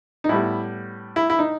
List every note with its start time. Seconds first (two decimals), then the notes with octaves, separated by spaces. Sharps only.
0.24 D#4
0.29 A2 G3 B3 E4
1.16 E4
1.30 E4
1.39 D#4